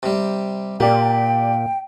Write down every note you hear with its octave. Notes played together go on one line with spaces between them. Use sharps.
C3 G3
A#2 A#3 G4 D5 G5